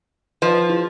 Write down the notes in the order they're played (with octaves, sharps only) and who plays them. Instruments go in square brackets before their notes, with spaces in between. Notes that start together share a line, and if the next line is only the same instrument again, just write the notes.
[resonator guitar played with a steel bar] F3 [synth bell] B4
[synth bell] E4